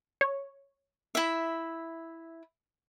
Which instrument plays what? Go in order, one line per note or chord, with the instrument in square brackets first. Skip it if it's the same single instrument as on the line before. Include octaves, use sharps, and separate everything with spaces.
[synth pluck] C#5
[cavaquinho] E4 E5